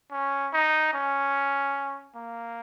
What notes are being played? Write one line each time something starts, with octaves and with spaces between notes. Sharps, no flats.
C#4
D#4
C#4
A#3